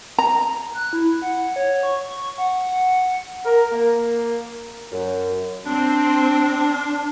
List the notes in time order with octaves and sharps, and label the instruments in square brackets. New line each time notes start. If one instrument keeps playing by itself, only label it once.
[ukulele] A#5
[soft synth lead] F#6
E4
F#5
C#5
C#6
C#6
F#5
[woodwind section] A#4
A#3
F#2
[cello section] C4 [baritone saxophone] D4